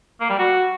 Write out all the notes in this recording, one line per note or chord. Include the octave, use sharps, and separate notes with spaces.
A#3
G3
F#4